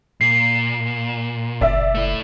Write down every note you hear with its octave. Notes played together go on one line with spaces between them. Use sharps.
A#2 C7
F#1 D5 E5
A3 E4